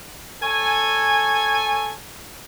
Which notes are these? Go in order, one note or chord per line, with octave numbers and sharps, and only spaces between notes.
A4 C#5 G#5